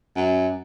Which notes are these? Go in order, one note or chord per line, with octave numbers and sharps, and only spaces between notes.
F#2